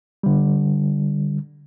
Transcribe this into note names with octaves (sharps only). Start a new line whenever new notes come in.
D3 G3